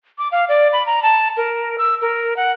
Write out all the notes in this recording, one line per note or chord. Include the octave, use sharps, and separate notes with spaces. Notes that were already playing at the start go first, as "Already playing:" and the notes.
D6
F5
D5
B5
A#5
A5
A#4
E6
A#4
F#5